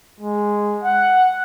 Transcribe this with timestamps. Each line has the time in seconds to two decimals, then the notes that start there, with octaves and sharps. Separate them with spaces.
0.20 G#3
0.83 F#5